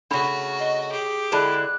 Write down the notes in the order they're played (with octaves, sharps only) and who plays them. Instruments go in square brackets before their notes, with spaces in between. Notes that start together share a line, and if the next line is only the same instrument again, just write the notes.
[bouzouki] C#3 A3 [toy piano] D4 B5 [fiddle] F#4
[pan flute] D#5
[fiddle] G4 [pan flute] G#4
[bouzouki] D3 G#3 E4 [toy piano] G#4 A5 B5 [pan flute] F#6